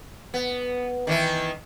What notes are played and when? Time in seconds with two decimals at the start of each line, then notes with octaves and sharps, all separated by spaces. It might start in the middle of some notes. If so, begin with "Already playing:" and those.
0.34 B3
1.07 D#3 E3 E4